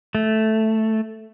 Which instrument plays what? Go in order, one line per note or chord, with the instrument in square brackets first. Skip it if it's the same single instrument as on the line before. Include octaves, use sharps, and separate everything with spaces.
[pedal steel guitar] A3